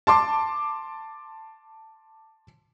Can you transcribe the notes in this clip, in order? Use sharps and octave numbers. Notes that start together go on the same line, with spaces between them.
A5 C6 D6